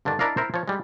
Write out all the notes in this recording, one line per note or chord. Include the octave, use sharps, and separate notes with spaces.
G2 D3 D#3 D4
D4 E4 A#4 D5 D#5 F5
E4 A#4 C5
F3 C#5
G3 G#3